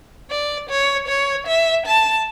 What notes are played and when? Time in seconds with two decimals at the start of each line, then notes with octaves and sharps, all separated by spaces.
0.31 D5
0.70 C#5
1.08 C#5
1.47 E5
1.86 A5